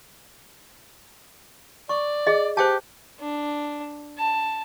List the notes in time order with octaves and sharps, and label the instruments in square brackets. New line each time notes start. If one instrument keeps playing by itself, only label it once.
[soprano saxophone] D5 [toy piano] C#6
[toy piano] G#4 D#5
[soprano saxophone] G4 [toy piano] C5 G5 A5
[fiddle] D4
A5